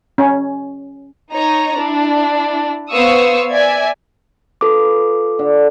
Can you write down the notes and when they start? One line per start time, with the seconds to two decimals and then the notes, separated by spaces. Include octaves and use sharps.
0.18 C#4
1.31 D#4 C#5 A#5
1.77 D4 E4
2.91 B3 C5 F5 C#6 D#6 E6
3.51 D5 E5 G#5 G#6
4.61 F4 A4 B4 D6
5.39 D3